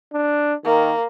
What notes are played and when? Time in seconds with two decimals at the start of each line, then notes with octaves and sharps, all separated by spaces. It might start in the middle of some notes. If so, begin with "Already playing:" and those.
0.13 D4
0.64 D#3 A#3